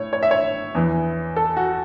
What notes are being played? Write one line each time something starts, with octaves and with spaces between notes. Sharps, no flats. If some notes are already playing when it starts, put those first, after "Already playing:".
Already playing: A2 C#5
C#5
E5
C#5
E2 E3
A4
F#4